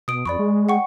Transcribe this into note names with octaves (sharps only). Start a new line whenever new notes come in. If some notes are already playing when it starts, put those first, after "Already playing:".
B2 D#6 D7
F2 D5 B5 C#6
G#3
F#5 G5 C#6